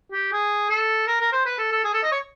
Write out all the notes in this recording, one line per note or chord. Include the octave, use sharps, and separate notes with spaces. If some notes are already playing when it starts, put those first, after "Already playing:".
G4
G#4
A4
A#4
A#4
C5
B4
A4
A4
G#4
A4
D#5
C#5